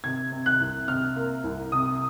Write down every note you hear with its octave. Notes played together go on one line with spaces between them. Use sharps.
C3 G#6
C3
F#6
C2
C3 F6
A#3
C2
C3 D#6